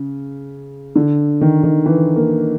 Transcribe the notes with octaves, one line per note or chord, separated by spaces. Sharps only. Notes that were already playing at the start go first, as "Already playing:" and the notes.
Already playing: C#3
D3
D#3
D#3
E3
A#3